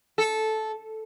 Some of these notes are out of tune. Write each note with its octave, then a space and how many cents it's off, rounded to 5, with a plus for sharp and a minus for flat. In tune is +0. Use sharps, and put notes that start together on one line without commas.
A4 -10